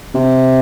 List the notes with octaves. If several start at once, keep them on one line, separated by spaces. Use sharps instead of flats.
C3